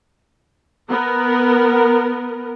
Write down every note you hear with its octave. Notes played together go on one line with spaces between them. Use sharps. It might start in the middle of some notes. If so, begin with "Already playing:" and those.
B3 A#4